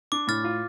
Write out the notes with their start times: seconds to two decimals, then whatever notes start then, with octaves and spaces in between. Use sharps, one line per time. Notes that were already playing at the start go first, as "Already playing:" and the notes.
0.12 D4 D6
0.28 A2 F6 A6
0.44 F4